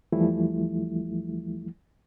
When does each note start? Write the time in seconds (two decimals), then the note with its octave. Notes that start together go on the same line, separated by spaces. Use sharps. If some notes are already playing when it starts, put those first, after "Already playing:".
0.12 E2 E3 F3 G3 A3 E4